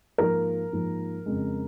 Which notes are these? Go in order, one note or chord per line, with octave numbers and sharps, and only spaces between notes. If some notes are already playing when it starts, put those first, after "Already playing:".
G#2 F3 A#3 A#4
G#2 F3 A#3
F2 C#3 G#3